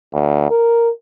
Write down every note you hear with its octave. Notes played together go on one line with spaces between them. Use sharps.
D2
A#4